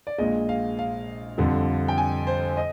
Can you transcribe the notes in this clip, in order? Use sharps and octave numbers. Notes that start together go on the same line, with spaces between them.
D5
A#1 A#2 G#3 D#5
F5
F5
F2 D3 G3
G5
G#5
C5
D#5